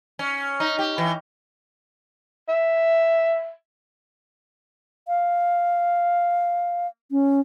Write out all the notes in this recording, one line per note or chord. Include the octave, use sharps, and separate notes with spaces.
C#4
D#4
G4
E3
E5
F5
C#4